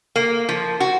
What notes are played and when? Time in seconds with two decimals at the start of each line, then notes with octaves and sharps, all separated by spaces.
0.16 A#3
0.49 F3
0.80 F#4